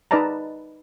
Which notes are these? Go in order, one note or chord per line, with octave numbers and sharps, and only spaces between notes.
D#4 B4 D5 D#5 A5 A#5